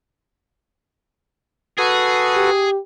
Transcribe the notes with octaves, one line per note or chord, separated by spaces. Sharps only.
F#4 G#4 A4 B4
G4